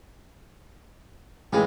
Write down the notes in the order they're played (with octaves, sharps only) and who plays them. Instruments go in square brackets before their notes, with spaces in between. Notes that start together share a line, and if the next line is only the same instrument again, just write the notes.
[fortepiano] A2 E3 G#3 [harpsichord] G4 G#4 F5